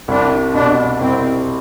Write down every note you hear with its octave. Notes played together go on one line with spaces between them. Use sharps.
C2 D4
B2 D4
C2 C4